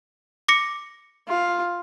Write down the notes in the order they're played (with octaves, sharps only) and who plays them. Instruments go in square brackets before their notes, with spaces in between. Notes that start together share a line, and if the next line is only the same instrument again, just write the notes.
[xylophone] D6 A#6 C#7
[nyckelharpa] F4